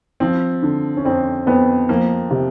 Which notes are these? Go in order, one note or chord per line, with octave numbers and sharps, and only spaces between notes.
F3 C4
D3
C#4
F2 C4
F2 B3
F3 A#3
C3